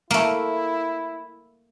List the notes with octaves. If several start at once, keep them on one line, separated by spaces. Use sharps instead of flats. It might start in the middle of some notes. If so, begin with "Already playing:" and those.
A3 A#3 E4